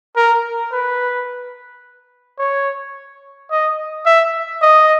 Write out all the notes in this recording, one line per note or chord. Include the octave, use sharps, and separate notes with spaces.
A#4
B4
C#5
D#5
E5
D#5